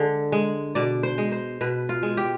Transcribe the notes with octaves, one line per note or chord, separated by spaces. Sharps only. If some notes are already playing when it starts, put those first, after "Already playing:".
Already playing: D3 G#3
G#3
B2 D5
C5
G#3
C5
B2 B4
F4
G#3
G4